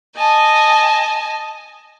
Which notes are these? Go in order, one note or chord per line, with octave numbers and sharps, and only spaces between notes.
D#5 G#5 A5